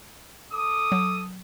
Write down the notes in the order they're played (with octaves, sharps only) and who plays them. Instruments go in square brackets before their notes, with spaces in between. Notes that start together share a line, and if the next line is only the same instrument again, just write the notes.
[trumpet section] A4 D6 D#6
[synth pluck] F#3